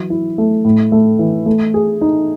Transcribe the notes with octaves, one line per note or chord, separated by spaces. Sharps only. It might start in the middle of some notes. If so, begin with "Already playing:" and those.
Already playing: E3 F#3
E4
A3
A2
A3
E3
A3
G#4
D#4